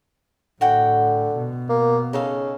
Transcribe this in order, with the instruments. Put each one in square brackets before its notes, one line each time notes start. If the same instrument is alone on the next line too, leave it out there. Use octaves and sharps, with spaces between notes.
[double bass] A2 [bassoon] D3 [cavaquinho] F#4 F#5 G5
[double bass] B2
[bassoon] A#3
[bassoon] C#3 [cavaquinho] D#4 A4 F5